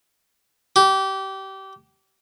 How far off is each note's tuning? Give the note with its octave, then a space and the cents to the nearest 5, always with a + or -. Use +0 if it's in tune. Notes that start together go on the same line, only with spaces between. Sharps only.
G4 -25